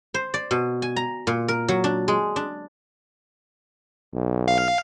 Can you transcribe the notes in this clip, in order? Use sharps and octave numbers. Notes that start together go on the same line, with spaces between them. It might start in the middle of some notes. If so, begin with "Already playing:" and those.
C5
D5
B2
G#5
A#5
A#2
A#4
F#3
D4
G#3
D4
B1
F5